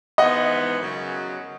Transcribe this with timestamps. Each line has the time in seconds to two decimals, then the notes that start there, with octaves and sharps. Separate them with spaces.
0.18 G#2 E3 B3 D#5 F#5
0.79 F#2 C#3 F#3